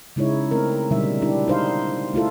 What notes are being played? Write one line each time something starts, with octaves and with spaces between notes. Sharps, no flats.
C#3 G#3 D#4 E4 C#5
A3 C4 A#4
B2 D3 G3 G#3 D#4 E5
D4 E4 G4
D#4 C5 F5
A3 E4 F4 A4